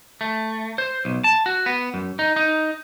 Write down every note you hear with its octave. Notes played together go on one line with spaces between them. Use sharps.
A3
C5
B1
A5
F#4
B3
F#2
D#4
D#4